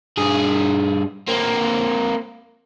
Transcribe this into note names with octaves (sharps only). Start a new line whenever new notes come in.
G2 G#4
A#3 C4